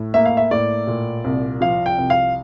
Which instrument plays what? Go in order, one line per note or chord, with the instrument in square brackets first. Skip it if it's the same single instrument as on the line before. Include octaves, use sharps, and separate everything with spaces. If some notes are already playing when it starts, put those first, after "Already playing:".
Already playing: [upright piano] A2
A#3 E5
F5
E5
A2 D5
A#2
C2
F3 F5
G5
C2
F5